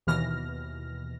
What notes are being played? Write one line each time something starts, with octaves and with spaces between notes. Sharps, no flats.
D#2 B2 E3 F6 A#6